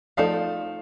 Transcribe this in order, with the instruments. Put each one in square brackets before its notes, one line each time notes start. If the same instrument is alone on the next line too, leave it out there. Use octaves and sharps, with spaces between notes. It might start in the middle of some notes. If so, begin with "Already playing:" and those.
[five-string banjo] F3 A3 D#4 A4 D5 [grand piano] F5